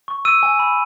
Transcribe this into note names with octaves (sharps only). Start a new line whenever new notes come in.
C#6
E6 D#7
G#5
B5